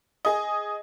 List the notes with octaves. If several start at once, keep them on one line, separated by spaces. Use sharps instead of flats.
G#4 D#5